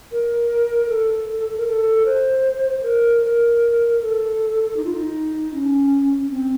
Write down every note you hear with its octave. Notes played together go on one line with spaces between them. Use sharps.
A#4
A4
A#4
A4
C5
A#4
A#4
A#4
A4
D#4
F4
D#4
C#4
C4